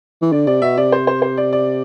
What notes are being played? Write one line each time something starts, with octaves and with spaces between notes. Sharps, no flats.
E3
D3 D5
C3 D5
B2 E5
C3 D5
C5
C5
C5
D5
D5